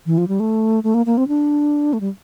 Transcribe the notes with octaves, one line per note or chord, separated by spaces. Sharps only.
E3
F3
G3
A3
A3
A#3
A#3
C4
D4
A3
G3